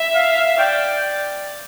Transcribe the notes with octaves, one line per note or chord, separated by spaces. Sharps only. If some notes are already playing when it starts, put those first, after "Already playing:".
Already playing: E5
F5
D5 G5